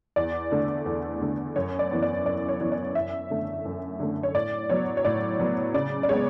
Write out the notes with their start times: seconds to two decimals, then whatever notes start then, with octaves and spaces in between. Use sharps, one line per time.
0.16 E2 D5
0.52 D3 A3
0.86 E2
1.21 D3 A3
1.56 F#2 C#5
1.79 D5
1.91 E3 B3
2.02 D5
2.25 F#2 D5
2.48 C#5
2.61 E3 B3
2.72 D5
2.95 F#2 E5
3.30 D3 A3
3.65 F#2
4.00 D3 A3
4.23 C#5
4.34 A2 D5
4.70 F#3 B3 C#5
4.97 C#5
5.05 A2 D5
5.39 F#3 B3
5.74 C#3 D5
6.03 D5
6.09 G#3 B3 C#5